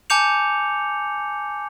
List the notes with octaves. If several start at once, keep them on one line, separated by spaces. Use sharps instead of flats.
G#5 A5 D6 G6 C#7 F7